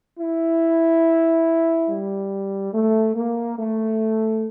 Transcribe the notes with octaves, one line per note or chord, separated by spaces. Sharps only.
E4
G3
A3
A#3
A3